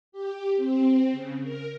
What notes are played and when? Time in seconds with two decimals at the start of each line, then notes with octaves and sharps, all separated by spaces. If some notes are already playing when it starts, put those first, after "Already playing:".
0.12 G4
0.57 C4
1.13 C#3
1.43 A#4